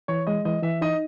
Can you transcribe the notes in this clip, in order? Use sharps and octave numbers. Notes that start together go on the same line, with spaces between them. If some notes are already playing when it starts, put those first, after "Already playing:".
E3 C#5
G#3 D#5
E3 D#5
E3 E5
D#4 D#5